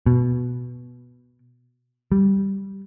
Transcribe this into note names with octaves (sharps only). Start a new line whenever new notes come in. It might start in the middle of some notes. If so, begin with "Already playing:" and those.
B2
G3